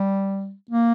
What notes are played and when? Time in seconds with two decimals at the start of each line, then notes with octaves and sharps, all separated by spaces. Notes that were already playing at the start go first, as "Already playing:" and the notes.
Already playing: G3
0.71 A#3